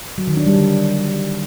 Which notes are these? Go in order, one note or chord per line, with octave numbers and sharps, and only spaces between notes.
F#3
D#3
D4
G3
D3